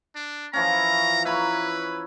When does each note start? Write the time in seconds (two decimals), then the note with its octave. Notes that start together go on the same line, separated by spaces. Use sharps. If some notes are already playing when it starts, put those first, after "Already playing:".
0.15 D4
0.53 E3 F3 C#4 A#5
1.25 E4 B4 C#5 A#5